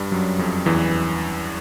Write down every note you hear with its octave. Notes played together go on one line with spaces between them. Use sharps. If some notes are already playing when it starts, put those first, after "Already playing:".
Already playing: G2 G3
F#2 F#3
F2 F3
E2 E3